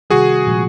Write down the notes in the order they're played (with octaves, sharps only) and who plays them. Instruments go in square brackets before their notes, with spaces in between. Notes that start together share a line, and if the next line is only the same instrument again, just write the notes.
[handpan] C3 D#3 G3 [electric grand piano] F#4 G#4
[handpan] A#2 F3 G#3